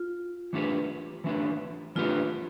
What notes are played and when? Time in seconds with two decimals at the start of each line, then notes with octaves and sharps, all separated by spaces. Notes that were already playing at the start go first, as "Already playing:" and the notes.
Already playing: F4
0.53 E3 A3 D4 G4 B4
1.24 E3 A3 D4 G4 B4
1.96 E3 A3 D4 F4 G4 B4